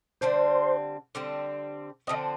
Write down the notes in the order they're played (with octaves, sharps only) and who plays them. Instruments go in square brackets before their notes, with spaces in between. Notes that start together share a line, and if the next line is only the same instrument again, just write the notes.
[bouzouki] D3 G3 C4 [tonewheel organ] C5
[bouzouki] D3 G3 C4
[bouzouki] D3 F3 C4 [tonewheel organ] D#5